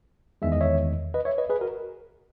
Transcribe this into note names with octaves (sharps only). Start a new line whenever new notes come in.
E2 D#3 G#3 E5
D#5
C#5 E5
B4 D#5
C#5 E5
B4 D#5
G#4 B4
F#4 A#4